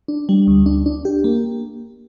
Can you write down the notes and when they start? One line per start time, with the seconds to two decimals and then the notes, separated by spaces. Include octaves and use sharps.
0.08 D4
0.29 G3
0.47 D2
0.66 D4
0.86 D4
1.05 G4
1.24 A#3